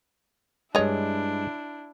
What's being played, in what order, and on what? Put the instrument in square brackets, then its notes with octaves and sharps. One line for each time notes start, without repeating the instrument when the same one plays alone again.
[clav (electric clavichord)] G2 G#3 [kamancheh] D4 E4 [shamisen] C#5 D#5